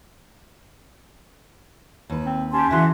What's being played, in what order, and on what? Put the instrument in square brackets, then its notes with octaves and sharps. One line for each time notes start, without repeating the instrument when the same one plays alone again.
[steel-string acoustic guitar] D#2 B4
[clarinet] C4
[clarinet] C#4 [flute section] G4 A5 C6
[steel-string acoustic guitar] C#3 E3 [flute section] F#4 E5 C6